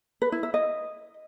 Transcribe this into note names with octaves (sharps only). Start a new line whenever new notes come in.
B4
E4
E5
D#5